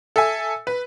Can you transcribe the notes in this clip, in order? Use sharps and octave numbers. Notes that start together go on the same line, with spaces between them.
A4 E5 G#5
B4